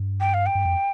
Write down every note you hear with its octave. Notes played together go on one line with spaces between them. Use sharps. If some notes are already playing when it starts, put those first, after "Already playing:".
Already playing: G2
G5
F5
G5
G2
F2